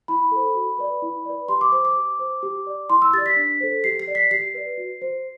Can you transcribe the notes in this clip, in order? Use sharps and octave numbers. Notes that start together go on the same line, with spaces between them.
E4 B5
A4 C5
F#4
B4 D5
E4
B4 D5
G4 C6
D6
C5 D6
D6
G4
C5
G4
D5
E4 C6
E6
G4 D5 A6
B6
D4
A4 C5
G4 C7
C7
D5
B6
G4 C7
B4 D5
F#4
C5